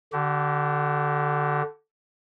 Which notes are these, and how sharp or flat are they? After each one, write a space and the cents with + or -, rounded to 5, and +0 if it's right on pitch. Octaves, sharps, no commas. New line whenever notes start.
D3 +0 G4 -45